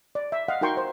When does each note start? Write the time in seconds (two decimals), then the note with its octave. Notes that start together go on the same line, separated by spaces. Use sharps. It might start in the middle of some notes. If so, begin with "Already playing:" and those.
0.15 D5
0.32 E5
0.48 D#5 F5 F#5
0.61 D#4 F#4 A#4 G5 C6 C#6
0.77 C5